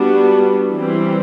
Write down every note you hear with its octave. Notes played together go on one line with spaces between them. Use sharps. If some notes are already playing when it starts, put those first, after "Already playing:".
Already playing: G3 B3 D4 F#4
E3 G3 C4